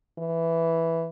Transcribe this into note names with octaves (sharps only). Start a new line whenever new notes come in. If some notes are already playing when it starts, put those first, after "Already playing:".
E3